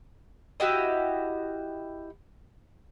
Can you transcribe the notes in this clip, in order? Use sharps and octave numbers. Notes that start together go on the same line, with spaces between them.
E4 F#4 G4 D#5